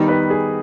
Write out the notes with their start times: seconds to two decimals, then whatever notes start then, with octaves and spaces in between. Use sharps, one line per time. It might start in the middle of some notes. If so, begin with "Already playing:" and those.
Already playing: D#3 G3 B3 D#4
0.08 B4
0.30 G#4